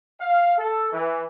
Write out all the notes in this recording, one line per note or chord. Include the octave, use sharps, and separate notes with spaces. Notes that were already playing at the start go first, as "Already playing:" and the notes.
F5
A4
E3